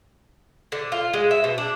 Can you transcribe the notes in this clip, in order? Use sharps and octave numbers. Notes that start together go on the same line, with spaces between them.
D3
F4
G#3
E5
B2
D4